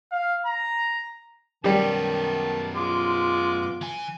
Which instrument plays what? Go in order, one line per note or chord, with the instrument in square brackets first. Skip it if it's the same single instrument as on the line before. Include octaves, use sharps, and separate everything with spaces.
[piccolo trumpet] F5
A#5
[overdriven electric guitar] F#2 B3 [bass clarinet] D#3 [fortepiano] G3 G4 [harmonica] A5
[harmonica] G#3 C6 D6 [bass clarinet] F4
[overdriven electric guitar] E3 G#5